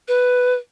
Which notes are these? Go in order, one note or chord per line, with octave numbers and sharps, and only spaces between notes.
B4